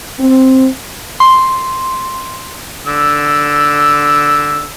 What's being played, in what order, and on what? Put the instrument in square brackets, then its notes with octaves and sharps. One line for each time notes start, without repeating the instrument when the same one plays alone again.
[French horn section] C4
[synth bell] C6
[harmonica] D3 E6